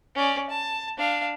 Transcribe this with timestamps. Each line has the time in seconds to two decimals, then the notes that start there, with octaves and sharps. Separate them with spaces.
0.15 C#4 D5
0.50 A5
0.98 D4 F5